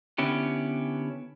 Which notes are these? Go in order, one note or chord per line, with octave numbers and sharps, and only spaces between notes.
D3 B3 C#4 E4 G4